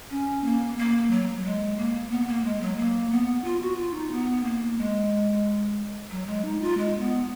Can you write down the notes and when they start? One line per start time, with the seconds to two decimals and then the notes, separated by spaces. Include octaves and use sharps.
0.10 C#4
0.44 A#3
0.78 A#3
1.11 F#3
1.39 F#3
1.44 G#3
1.78 A#3
2.11 B3
2.27 A#3
2.44 G#3
2.61 F#3
2.77 A#3
3.11 B3
3.44 F4
3.61 F#4
3.77 F4
3.94 D#4
4.11 B3
4.44 A#3
4.78 G#3
6.11 F#3
6.27 G#3
6.45 D#4
6.61 F4
6.78 G#3
7.00 B3